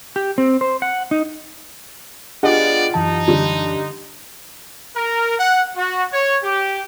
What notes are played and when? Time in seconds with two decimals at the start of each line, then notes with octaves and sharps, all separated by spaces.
0.16 G4
0.38 C4
0.61 C5
0.82 F#5
1.11 D#4
2.43 B3 D4 F4 G4 G#4 D5 D#5 F#5
2.94 F#2 E3 D#4 A5
3.28 D3 G3
4.96 A#4
5.39 F#5
5.77 F#4
6.13 C#5
6.44 G4